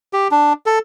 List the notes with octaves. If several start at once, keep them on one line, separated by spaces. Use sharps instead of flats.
G4
D4
A4